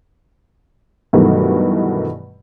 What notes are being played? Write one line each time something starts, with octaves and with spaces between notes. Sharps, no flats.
G2 B2 D#3 E3 F#3 A3